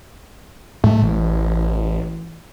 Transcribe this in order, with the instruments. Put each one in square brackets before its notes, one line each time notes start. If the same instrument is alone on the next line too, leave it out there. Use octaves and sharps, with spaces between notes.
[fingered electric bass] A2 G#3 [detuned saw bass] A3
[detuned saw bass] A1 [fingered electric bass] E3